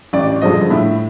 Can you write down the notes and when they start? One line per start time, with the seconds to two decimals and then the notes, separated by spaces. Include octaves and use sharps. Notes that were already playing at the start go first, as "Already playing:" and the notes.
0.13 A1 D5
0.28 D5
0.41 G2 D3 F3 G#3 D#5
0.70 A2 E5